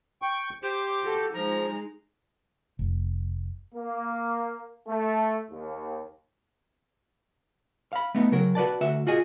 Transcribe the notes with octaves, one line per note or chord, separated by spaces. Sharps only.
G5 C#6
G4 C5 D6
F#4 A4
F3 G#3 D#4 A#5
F1
A#3
A3
D#2
F5 B5
A3 B3 D#4
C#3 F#3 A#4
F#4 B4 D5 A5
D2 F#4 E5
F4 F#4 G#4 D#5